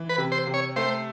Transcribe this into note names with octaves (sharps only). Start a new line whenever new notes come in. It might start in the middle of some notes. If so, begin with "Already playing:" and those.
Already playing: E3
B4
C3
C5
C3
C#5
A3 C5